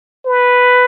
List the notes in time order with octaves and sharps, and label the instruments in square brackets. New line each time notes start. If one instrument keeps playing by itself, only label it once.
[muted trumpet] B4